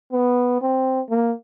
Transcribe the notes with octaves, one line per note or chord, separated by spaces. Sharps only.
B3
C4
A#3